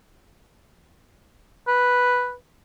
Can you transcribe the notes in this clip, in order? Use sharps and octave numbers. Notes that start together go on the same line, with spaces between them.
B4